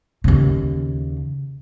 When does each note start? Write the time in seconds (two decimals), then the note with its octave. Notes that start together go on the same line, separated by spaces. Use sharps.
0.24 D#2 C#3